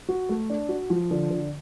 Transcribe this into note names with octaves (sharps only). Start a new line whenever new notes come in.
F#4
A3
D4
F#4
F3
D3
D3